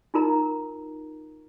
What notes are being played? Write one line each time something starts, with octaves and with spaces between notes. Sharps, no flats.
D#4 F4 A#4 A#5